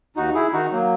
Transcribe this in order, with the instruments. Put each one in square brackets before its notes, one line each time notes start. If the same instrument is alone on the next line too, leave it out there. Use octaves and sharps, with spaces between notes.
[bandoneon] D#2 D#4 F#4
E4 G#4
D#3 D#4 F#4
F#3 A#3